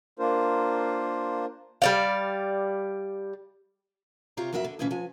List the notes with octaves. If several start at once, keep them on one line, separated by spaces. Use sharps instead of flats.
A#3 D4 F4 A#4 C5
G3 D5 F5
C3 F4 G4 C#5 A#5
F2 F#3 F#4 A#4 E5
D3
D2 G2 A#2 E3 C#4
F3 G#5